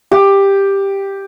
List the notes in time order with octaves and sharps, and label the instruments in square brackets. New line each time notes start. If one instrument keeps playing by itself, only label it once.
[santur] G4